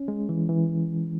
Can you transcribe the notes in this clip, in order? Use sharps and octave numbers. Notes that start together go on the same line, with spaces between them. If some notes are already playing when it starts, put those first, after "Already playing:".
Already playing: C#4
G#3
E3
E3